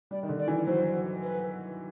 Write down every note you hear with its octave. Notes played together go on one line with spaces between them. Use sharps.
G3 D5
D#3
D3
D5
E3
F#3 C5
B4